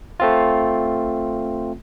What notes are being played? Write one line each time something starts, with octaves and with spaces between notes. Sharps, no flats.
A3 C4 F4